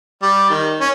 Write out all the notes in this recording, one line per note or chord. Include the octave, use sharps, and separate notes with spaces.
G3
D#3
C#4